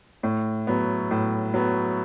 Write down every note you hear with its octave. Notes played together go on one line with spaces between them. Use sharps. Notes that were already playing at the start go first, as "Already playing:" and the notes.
A2
F#3 B3
A2
F#3 B3